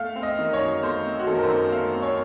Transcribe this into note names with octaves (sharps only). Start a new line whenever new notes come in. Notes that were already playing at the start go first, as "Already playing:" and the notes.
Already playing: A3 F5
C4
D#5
D#3
C#5
F#2
A3 C5
C4
F#4
D#3 A4
A#4
C5
F#2
A3 F5
C4
C#5